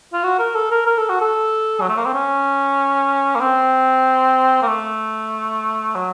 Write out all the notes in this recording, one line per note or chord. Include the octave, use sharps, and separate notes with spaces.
F4
F#4
A#4
A4
A#4
A#4
A4
F#4
A4
F#3
A3
A#3
C4
C#4
A#3
C4
A#3
A3
F#3